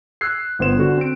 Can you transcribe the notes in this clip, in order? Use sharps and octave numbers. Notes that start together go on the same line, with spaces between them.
E6 F#6 G#6 C7
G1 B3 C5 E7
D3 F#4
C4 D7